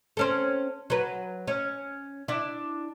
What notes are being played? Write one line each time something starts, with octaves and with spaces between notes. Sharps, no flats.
C4 C#4 A4
F#3 B4
C#4
D4 E4